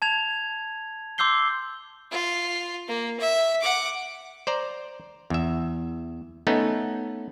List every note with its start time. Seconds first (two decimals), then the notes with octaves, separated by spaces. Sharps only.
0.02 A5 G#6 F7
1.18 C6 D6 E6 G6 C7 G7
2.11 F4
2.88 A#3
3.20 E5
3.61 F#5 D6
4.47 C5 D5 A#5
5.30 E2 E5
6.47 A3 B3 C#4 D#4